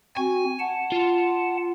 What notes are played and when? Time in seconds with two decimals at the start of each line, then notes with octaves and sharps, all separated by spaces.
0.17 C4 F#4 G#5
0.59 F#5 A5
0.92 F4